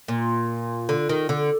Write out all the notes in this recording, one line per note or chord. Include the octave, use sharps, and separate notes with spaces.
A#2
D3
D#3
D3